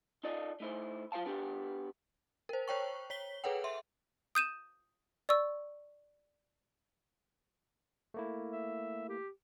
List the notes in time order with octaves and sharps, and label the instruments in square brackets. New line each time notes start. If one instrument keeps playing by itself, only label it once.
[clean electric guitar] D#4 F4 A4 D5 D#5
A3 D#4 E4 C5
F#3 F4 C5 F5 A5
B3 D4 F#4 G4
[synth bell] A#4 C5
C5 C#5 G5 C#6
C#5 B6 G7
G#4 A4 B4 C#5 F#5 G5
E5 C6
[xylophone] D#6 G6 D#7 E7
D5 C#6 E6
[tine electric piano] A3 A#3 E4
[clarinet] E5
G4